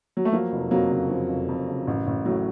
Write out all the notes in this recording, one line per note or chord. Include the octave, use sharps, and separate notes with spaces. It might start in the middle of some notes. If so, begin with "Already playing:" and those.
F#3
A3
F3 F#3 A#3
F1
F2 F#3 A#3
C#3
F3
F1
F2
C#3
A1
A1
A2 F#3